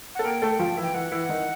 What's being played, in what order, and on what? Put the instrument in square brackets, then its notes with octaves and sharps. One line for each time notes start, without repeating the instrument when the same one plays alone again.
[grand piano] A4 [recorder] F#5
[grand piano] A#3 A#4 [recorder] G5
[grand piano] A3 A4
F3 F4
E3 E4
[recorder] G5
[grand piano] E3 E4 [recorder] F#5
[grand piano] E3 E4
D#3 D#4